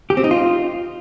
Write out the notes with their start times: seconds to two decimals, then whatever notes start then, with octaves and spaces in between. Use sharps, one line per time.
0.10 G4
0.17 C4
0.24 D#4
0.31 F4